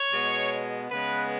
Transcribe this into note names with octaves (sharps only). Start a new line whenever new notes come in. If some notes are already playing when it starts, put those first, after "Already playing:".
Already playing: C#5
B2 G#3 B3
C#3 G#3 B3 B4